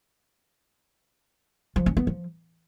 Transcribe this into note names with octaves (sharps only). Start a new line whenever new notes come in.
F3
C#4
B3
F3